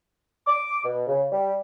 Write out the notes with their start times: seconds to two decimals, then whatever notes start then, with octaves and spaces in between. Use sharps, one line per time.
0.46 D6
0.84 B2
1.07 C#3
1.31 G3